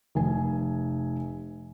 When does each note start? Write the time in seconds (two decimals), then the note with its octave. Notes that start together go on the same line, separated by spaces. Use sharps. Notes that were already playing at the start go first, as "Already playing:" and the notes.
0.15 F1 G#5